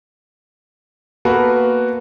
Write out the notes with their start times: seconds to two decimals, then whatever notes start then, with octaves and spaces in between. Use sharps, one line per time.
1.25 A#3 B3 F#4 A4 B4